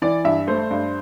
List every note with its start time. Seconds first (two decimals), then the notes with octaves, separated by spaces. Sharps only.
0.02 E3 D5
0.24 G2 E5
0.47 A3 C5
0.70 G2